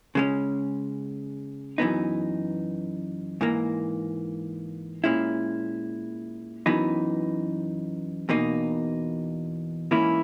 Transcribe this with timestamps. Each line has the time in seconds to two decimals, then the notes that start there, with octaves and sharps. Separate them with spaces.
0.15 C#3 G#3 C#4
1.78 F#2 E3 B3 D#4
3.41 G#2 E3 A#3
5.04 A#2 G#3 C#4 E4
6.66 F#2 E3 B3 D#4
8.29 E2 B2 A#3 D#4
9.91 G#2 E3 A#3 C#4 E4